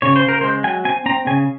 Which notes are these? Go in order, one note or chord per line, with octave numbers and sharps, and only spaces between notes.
C#3 C#5
C5
C#3
A#4
G#3 C5
F#3 G#5
C4 G#5
C4 A#5
C#3 G#5